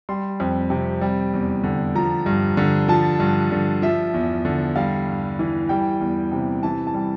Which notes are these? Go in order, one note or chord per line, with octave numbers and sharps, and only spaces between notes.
G3 C6
F2
C3
G3
E2
D3
F3 A#5
G2
D3
F3 A5
G2
D3
F3 E5
E2
D3
G3 F5
G2
E3
G3 G5
E2
C3
E3 A5
A5
G3